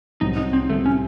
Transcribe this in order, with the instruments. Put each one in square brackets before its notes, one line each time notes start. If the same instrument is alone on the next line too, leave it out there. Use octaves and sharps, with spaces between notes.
[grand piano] C2 C3 F#3 C4 [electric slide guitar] D#4
[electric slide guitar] D#4
C4
[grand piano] C2 C3 F#3 C4 [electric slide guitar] A3
[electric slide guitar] C#4